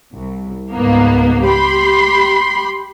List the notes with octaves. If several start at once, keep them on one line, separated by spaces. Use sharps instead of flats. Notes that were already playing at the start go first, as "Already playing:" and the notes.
C2
C#2 G#2 A#3 B3
G4 B5 C6